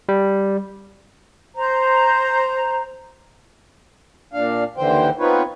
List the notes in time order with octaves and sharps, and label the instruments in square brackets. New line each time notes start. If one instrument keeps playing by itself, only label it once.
[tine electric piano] G3
[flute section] C5 A#5
[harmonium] A#2 D4 F5
D#2 D3 E3 C5 G5
B3 C4 D#4 F4 B4 C#5